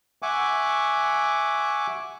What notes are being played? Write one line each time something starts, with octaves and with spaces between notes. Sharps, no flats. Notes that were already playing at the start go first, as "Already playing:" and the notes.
E5 F#5 G#5 C#6 D6